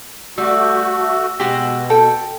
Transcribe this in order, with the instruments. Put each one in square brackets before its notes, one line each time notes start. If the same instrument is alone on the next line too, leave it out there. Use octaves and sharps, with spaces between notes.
[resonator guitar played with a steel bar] G3 [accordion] A3 F#4 [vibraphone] E6
[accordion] B2 [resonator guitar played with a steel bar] G#3 F#4 [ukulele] G4
[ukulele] A4 [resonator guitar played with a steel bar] G5